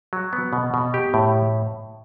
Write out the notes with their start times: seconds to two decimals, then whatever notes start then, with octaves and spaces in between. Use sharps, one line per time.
0.13 F#3
0.33 B3
0.53 B2
0.74 B2
0.94 G4
1.14 A2